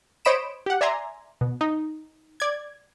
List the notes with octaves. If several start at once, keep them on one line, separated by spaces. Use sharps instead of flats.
C5 C#5 D#5 B5 D7 E7
G4 F#5
D5 E5 G#5 A#5 C6
B2
D#4
D5 G#6